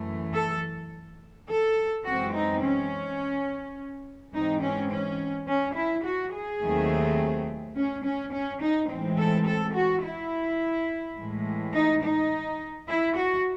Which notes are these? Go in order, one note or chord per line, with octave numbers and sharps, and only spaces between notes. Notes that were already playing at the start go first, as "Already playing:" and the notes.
Already playing: F#2 E3 A3
A4
A4
F#2 E3 G#3 C4 F#4
D#4
C#4
G#2 E3 G#3 C4 D#4
C#4
C#4
C#4
E4
F#4
G#4
D#2 D#3 F#3 A3 C4
C#4
C#4
C#4
D#4
A2 E3 G#3 C4
A4
A4
F#4
E4
A2 E3 G#3
D#4
D#4
E4
F#4